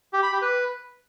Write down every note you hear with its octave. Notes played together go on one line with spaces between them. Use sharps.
G4
B5
G4
B4